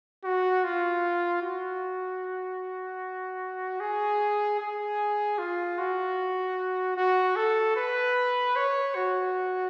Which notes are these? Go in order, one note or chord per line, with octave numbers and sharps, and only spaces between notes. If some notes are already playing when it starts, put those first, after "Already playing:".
F#4
F4
F#4
G#4
G#4
F4
F#4
F#4
A4
B4
C#5
F#4